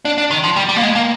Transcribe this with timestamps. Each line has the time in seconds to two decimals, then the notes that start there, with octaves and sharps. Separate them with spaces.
0.05 D4
0.18 D4
0.31 D#3
0.44 F3
0.56 G3
0.69 G3
0.76 A#3
0.83 G#3
0.96 A#3